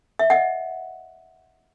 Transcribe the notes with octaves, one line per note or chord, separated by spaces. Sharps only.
E5
D#5 F#5